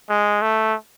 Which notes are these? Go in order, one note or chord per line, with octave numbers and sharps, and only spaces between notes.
G#3
A3